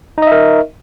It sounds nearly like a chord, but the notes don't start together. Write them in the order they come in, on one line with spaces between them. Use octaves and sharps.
D#4 D#5 E5 A#4